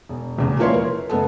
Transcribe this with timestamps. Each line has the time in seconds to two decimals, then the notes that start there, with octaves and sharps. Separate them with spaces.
0.09 E1
0.37 D#1 E2 C#3
0.59 F3 A#3 E4 C#5 D5 C6
0.74 A#4
1.09 F#1 G#3 B3 A4